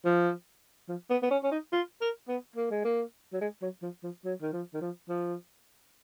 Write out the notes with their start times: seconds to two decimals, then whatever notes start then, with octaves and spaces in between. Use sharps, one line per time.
0.05 F3
0.89 F3
1.10 B3
1.23 B3
1.31 C#4
1.44 C#4
1.51 D#4
1.72 F4
2.01 A#4
2.29 B3
2.56 A#3
2.71 G#3
2.85 A#3
3.33 F#3
3.41 G#3
3.62 F#3
3.82 F3
4.03 F3
4.25 F#3
4.42 D#3
4.53 F3
4.74 D#3
4.81 F3
5.09 F3